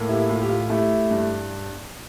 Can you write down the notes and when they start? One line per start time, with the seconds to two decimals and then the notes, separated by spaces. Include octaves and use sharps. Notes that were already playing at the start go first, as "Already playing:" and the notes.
Already playing: A2 A#3
0.09 E4 G4
0.29 A2 F4
0.41 G4
0.49 F4
0.70 A3 E4 G4
1.11 G2